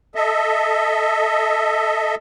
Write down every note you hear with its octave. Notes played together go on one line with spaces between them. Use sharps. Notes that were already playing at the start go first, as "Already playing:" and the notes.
A4 D#5 E5